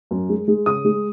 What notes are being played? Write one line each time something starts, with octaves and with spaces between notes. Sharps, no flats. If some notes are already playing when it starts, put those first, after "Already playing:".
F#2
G#3
G#3
C#3 D#6
G#3